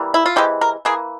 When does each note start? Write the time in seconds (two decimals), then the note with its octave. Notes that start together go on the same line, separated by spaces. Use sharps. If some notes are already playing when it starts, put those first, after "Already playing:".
Already playing: E3 G3 A#3
0.14 E4
0.26 F4
0.36 C3 E3 G#3 G4
0.61 A#4
0.85 E3 A#3 G#4